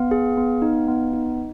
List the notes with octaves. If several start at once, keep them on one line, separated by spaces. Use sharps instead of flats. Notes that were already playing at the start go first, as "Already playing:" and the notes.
Already playing: B3 F5
G#4
B3
D#4
B3
D#4